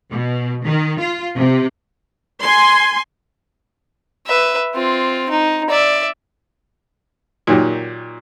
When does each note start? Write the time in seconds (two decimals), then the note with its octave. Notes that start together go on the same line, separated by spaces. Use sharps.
0.11 B2
0.64 D#3
1.00 F4
1.36 C3
2.43 G#5 C6
4.27 B4 E5
4.75 C4 F4
5.30 D#4
5.70 D5 E5
7.47 A#2 D#3 F#3 D#4 G4